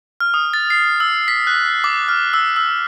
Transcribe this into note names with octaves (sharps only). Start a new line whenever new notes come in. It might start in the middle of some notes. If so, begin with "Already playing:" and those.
F6
D#6
A6
C7
E6
B6
F#6
D6
F6
E6
E6